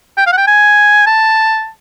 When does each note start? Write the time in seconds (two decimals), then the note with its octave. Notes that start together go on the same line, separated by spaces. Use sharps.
0.17 G5
0.27 F5
0.32 F#5
0.37 G5
0.47 G#5
1.06 A5